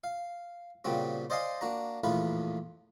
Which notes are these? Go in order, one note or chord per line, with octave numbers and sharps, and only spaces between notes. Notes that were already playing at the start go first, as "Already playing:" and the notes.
F5
A#2 C#3 G3 C4 F#4
C5 D5 D#5 F5 G#5 C6
A#3 D4 F#4 A#5
A#1 E2 A2 F4 B4 B5